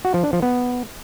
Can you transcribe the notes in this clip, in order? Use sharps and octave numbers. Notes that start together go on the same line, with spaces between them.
F#4
F3
D4
F3
B3